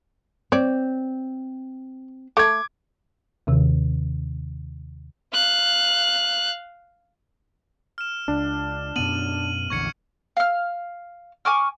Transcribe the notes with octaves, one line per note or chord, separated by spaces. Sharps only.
C4 C#5 D5
A3 D6 G#6
D#2 C3 D#3
F5 F#6
F6 E7
C#2 D4
F#2 B2 B3 D#7 F#7
A#1 E2 D3 C#6 G#6 C#7
F5 F6
G#5 C#6 D6 F6